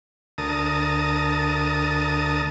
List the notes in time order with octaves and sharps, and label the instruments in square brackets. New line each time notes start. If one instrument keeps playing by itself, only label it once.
[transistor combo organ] D2 A#4 A5 D#6